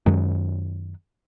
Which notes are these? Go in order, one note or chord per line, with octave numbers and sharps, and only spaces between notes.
F#2 D#3 F#3 G#3